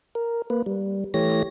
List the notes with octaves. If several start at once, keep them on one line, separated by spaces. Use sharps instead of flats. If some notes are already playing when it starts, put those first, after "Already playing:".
A#4
A#3 B4
G3
E3 A3 G4 C#5 A#6